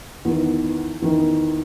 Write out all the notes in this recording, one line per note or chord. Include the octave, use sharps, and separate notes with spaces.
E2 D#3 B3
E2 D#3